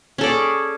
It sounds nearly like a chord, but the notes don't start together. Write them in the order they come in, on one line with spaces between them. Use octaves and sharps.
C#4 A4 D5 G#4